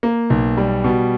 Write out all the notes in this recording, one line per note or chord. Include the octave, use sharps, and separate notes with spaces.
A#3
B1
G3
B2